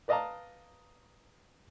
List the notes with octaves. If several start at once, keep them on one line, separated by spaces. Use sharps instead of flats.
B4 D5 D#5 F5 A5 A#5